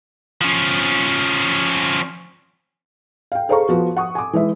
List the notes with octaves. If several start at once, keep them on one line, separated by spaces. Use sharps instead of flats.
F3 C#4
F5 G5
G#4 A4 C5 F5 A#5 C#6
F3 B3 F#4
F#5 C#6 D#6
G#5 D6
E3 G#3 G#4 E5